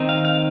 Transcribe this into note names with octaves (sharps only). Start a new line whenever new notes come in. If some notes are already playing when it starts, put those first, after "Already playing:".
Already playing: D#3 C4 D#4
F5
F5